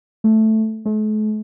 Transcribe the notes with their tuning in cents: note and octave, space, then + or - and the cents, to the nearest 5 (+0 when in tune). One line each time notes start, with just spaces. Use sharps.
A3 -5
A3 -45